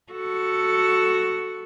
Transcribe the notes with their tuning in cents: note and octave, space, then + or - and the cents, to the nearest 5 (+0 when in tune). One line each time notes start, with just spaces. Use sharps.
F#4 +0 A4 +0